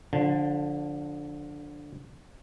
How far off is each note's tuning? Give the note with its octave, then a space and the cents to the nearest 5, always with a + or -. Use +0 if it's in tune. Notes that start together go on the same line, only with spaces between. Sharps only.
D3 +0 F3 +25